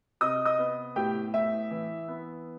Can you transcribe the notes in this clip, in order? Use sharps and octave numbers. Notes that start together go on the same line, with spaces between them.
C3 D#5 D#6
D#5 D#6
B3
A2 G4 G5
A2 E5
E3
B3